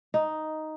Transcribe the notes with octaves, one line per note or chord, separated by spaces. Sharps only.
D#4